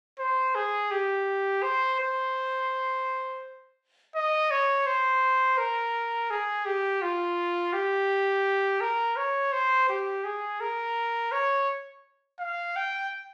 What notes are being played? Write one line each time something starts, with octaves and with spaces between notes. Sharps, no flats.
C5
G#4
G4
C5
C5
D#5
C#5
C5
A#4
G#4
G4
F4
G4
A#4
C#5
C5
G4
G#4
A#4
C#5
F5
G5